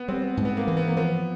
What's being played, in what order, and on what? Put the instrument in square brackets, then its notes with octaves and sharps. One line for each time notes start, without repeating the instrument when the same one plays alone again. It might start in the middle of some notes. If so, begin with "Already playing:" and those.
Already playing: [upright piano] B3
[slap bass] G3 [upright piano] C4
[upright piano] B3
[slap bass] G#2
[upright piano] B3
A#3
[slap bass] E3
[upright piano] B3
A#3
[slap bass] F3 [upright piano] B3